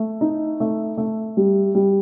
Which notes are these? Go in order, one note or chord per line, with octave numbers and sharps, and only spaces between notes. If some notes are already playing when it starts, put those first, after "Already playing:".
Already playing: A3
D#4
A3
A3
G3
G3